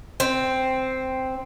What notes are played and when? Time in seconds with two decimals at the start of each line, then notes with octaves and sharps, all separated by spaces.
0.20 C4